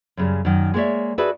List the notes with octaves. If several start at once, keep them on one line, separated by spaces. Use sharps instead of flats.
F#2 C#3 G3
F#2 D#3
G#3 A#3 B3 C#5 D5 E5
F#4 G#4 A4 B4 D5 E5